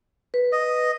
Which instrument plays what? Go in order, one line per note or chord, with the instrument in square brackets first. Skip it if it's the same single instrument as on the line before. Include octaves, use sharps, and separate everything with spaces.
[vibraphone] B4
[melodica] D#5